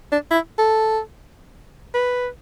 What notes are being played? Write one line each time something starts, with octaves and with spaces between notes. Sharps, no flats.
D4
E4
A4
B4